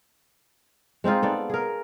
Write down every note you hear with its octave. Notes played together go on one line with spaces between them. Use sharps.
G#3 C4 D#4 F4
B3 A4 D5
G#4 A#4